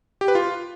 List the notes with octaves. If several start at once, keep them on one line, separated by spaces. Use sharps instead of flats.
G4
B4
F4